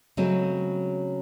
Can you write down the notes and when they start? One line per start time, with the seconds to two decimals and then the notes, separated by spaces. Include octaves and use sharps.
0.17 C#3 F#3 G#3 A3 C4